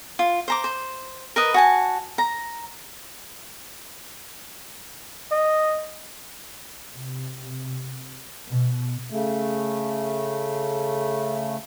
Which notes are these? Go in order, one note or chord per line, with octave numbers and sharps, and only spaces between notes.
F4
C5 A#5 D6
C5
A#4 B4 D#5
F#4 G#5 A5
A#5
D#5
C3
B2
C#3 A3